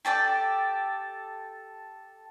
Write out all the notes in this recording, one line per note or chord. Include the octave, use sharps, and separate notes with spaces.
G4 A4 D5 G5